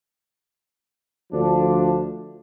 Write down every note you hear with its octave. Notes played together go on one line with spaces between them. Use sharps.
D2 F3 D4